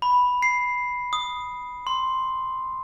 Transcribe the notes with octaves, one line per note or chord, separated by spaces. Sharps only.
B5
C7
D#6
C6